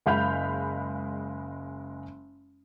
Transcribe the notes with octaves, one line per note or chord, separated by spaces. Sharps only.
F#1 G#3 F5 B5 G6 F7